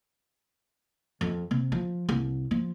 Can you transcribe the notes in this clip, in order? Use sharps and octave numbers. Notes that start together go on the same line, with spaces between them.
F2
C3
F3
C2
F3